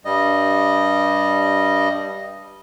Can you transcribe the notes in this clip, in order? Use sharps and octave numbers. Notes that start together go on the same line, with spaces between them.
G2 G3 D#5